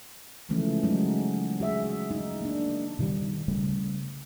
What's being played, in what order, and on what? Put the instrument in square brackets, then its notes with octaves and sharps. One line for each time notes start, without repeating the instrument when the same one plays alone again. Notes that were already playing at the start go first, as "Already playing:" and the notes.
[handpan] C#3 E3 F3 G#3 A3 C#4
F#3 G#3 C#4 D#4
F#4 G#4 E5
D#4
A#3 D4
[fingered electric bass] B2 D#3 F#3 G3
C#3 G3 A3